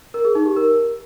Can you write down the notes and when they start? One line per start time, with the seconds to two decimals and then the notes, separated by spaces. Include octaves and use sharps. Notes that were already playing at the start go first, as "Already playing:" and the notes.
0.14 A#4
0.25 G#4
0.35 D#4
0.46 G4
0.56 A#4